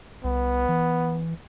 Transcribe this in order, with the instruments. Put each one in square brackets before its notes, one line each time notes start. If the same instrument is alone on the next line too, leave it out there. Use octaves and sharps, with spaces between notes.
[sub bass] C2 [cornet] B3
[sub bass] E3